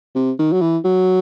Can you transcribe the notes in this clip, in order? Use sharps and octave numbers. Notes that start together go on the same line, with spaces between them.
C3
D#3
F#3
E3
F#3